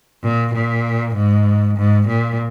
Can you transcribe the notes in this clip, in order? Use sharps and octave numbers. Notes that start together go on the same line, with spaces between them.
A#2
A#2
G#2
G#2
A#2